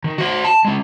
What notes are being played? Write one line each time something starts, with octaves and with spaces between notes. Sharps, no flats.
D#3
F#4 C5
A5
G#3 C#4